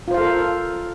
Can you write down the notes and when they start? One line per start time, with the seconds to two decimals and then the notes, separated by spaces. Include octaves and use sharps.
0.08 F4
0.11 C5
0.14 F5
0.17 A4
0.21 A#4